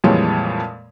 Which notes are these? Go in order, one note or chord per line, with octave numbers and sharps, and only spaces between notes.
F2 A#2 E3 G3 G#3 C#5